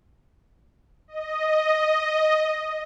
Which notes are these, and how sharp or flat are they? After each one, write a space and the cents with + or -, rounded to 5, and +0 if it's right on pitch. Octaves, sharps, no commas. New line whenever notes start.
D#5 +0